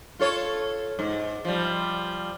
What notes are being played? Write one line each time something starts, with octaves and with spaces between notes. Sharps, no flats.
F4 A4 C#5
G#2
F3 G3